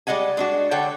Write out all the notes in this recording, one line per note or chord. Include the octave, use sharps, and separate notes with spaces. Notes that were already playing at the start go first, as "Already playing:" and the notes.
G3 G#3 D#5 F#5 G#5
G#3 D4 F#4
D3 A4 C#5 F#5 G5